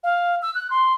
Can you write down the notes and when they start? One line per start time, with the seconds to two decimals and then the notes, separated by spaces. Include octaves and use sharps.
0.04 F5
0.42 E6
0.55 F#6
0.70 C6